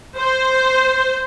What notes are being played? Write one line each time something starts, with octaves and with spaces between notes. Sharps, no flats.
C5